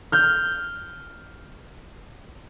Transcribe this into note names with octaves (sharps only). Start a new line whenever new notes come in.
F6 G6